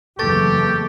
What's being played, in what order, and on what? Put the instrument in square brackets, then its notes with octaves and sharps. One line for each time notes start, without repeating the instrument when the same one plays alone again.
[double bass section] F#1 E2 A3 [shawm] G4 [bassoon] A4 [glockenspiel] C#6 A6